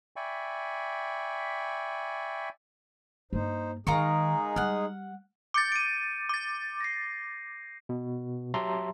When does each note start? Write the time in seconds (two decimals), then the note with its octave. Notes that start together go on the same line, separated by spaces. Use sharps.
0.16 D5 E5 G5 G#5 B5 C#6
3.33 G2 A#3 D#4 C5
3.87 D#3 G#3 D#4 F4 G#4 A#4 C#6
4.56 G3 F#5 F6
5.54 D6 G6 A6 C#7 D7
5.72 D7 D#7
6.29 D6 A6
6.81 A#6 C7
7.89 B2
8.54 F#3 G4 E5 A5 A#5 C6